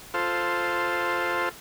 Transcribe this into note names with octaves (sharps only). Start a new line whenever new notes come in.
F4 A4 C5